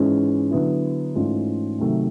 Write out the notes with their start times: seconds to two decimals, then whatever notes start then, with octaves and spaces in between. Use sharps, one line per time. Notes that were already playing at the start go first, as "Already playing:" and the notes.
Already playing: G#2 E3 G#3 C#4
0.51 D3 F#3 B3 E4
1.15 G#2 E3 A3 C#4 F4
1.79 C3 D#3 F#3 A3